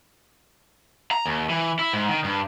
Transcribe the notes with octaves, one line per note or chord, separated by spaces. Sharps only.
A#5
D#2
E3
E4
G#2
D#3
G2